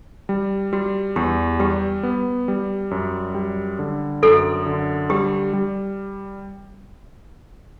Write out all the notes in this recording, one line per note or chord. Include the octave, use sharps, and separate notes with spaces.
G3
G3 F#4
E2 G4
G3 G4
B3
G3
F#2
G3
D3
F#2 A4
D3
G3 G4
G3